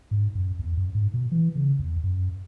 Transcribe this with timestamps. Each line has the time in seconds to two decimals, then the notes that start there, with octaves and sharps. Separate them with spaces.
0.11 G#2
0.35 F#2
0.59 E2
0.77 F#2
0.95 G#2
1.14 B2
1.32 E3
1.56 C#3
1.79 E2
2.03 F#2